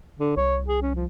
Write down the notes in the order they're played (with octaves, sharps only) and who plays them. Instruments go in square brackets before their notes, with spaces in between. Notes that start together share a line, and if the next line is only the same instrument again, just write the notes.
[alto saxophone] D3
[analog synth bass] C2 [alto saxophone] C#5
[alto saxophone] G#4
C#4
F3